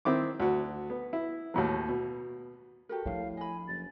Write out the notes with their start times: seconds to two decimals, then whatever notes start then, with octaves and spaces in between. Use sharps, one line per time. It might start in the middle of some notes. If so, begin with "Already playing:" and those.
0.05 D#3 C4 E4 D6
0.40 D2 F#4
0.90 B3
1.13 E4
1.54 D#2 A2 F#3
1.89 B2
2.89 F#4 G4 A4 A#4
3.06 A2 F3 D4 F5
3.37 D#5 G#5 B5
3.68 F#1 A6